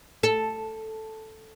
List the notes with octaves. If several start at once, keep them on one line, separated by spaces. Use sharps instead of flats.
A4